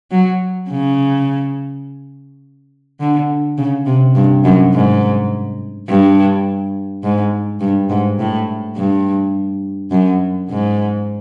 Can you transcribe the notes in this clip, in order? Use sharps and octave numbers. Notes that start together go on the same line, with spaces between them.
F#3
C#3
D3
C#3
C3
G2
F#2
G#2
G2
G#2
G2
G#2
A2
G2
F#2
G#2